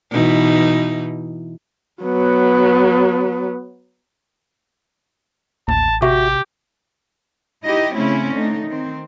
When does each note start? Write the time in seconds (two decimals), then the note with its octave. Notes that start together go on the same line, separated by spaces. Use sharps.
0.11 B2 E3 D#4
2.03 F#3 B3
5.68 A1 D#2 A5
6.02 C3 F#4 G4 E5
7.65 D#4 E4 G4 D#5
7.94 C#3 A3 C4 C#4 E4
8.34 D3 A3 D#4
8.66 D#3 C4